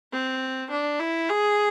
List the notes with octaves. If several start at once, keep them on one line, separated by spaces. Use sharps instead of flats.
C4
D4
E4
G#4